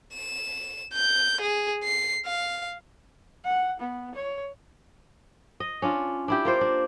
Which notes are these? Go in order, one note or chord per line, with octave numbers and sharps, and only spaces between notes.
E7
G6
G#4
C7
F5
F#5
B3
C#5
D#5
C#4 D4 F4
D4 E4 G4
A#3 F4 C5
D4